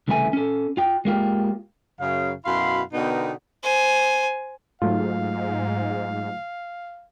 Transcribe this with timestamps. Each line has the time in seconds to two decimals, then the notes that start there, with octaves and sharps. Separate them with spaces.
0.08 C2 C#3 E3 A3 E4 G#5
0.33 C#4 A4
0.77 F4 G5
1.05 G#3 A#3 F4 G4
2.00 F#2 C#3 F5
2.46 F#2 B2 E4 F5 B5 C6
2.93 B2 D3 B3 D#4 A#4 G5
3.63 C5 G#5
4.82 G#2 F#3 A3 F4 F5